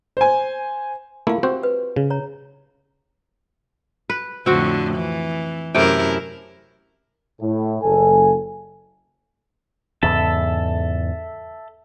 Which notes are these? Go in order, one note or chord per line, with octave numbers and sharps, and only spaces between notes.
C5 G#5
A3 A#3 E4 F4 F5
C4 F#4 G4 C5
B4
C#3
C#5 A#5
B4
F2 A2 D3 C4 F#4
E3
F#2 C3 A3 E4 A#4 G5
A2
F#1 A4 G#5
E2 G#2 C#3 A4 E5 A5